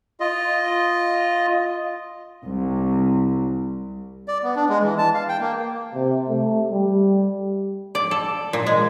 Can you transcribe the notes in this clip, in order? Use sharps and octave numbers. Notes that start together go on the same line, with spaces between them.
F4 D#5
C2
D5
B3
D4
G#3
E3
A5
F5
G5
A#3
C3
A3
G3
D5
A4
A#2
G#3